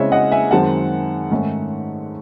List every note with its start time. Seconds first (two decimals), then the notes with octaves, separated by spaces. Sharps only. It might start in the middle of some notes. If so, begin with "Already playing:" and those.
Already playing: C#3 G#3 C4 E4 C#5 D#5 E5
0.12 D#5 F#5
0.31 E5 G#5
0.51 F#2 D#3 G#3 C4 F#5 A5
1.31 G#2 D#3 A3 C#4